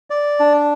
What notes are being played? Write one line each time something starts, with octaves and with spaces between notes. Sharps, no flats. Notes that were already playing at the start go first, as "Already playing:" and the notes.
D5
D4